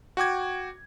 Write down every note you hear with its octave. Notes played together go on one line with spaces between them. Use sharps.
F#4 G5 D6 G#6